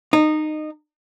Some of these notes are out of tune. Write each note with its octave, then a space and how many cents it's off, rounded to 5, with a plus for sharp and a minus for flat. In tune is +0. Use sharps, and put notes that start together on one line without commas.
D#4 -20